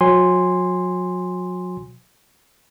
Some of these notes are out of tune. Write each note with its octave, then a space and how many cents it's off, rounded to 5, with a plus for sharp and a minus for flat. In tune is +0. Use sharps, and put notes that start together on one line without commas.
F#3 -35 G#5 -15 C6 +0